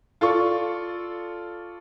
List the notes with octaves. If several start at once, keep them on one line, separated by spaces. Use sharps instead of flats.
F4 A4 D5 C#6